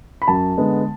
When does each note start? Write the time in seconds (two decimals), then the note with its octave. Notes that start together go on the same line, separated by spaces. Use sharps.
0.22 B5
0.28 F#2 A5
0.57 D3 G#3 B3